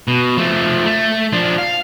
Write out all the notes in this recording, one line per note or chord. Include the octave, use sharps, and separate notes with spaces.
B2
F3 A3
A3
F3 D4
F5